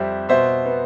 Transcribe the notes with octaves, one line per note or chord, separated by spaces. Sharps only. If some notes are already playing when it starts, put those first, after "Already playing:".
Already playing: F2 G3 C5 E5
B2 C5 E5
B3